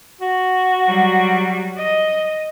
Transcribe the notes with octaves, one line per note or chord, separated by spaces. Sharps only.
F#4
F#3 G3
D#5